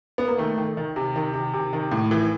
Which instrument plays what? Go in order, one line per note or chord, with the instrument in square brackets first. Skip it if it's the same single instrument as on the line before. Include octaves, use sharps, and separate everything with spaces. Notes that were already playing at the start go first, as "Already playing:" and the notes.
[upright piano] B3
A#3
D#3 A3
D#3
D#3
C3
D#3
C3
C3
D#3
A2
E3